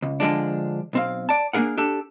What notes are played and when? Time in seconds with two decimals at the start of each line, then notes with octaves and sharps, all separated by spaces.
0.02 C#2
0.20 D3 F3 G#3 D4
0.93 B1 C4 F5
1.29 D5 A5
1.53 A#3 D4 G#4 A#4 F#5
1.78 D4 G4 A4